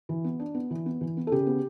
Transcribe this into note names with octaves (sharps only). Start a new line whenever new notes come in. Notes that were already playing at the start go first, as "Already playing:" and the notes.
E3
B3
D4
B3
E3
B3
E3
B3
A4
C#3 G4
B3